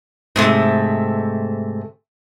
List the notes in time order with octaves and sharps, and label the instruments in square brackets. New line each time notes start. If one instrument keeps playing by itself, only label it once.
[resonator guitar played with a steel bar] G#2 C3 A3